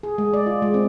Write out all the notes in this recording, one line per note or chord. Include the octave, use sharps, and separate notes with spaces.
G#4
G#3
D5
F4
G#3
C4